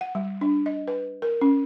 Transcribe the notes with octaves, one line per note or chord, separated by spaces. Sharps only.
F#5
G3
D4
D#5
B4
A#4
C#4